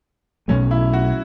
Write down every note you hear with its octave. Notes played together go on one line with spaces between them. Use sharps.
B1 B2 F#3 A3 C#4
E4
F#4